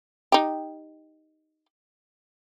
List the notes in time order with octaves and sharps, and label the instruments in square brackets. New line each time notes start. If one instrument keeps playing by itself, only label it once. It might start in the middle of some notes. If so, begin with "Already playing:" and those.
[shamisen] D#4 G4